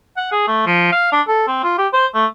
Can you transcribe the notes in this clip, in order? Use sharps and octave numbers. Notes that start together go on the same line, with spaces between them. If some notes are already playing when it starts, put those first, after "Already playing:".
F#5
G#4
A3
F3
F5
D4
A4
C4
F4
G4
C5
A3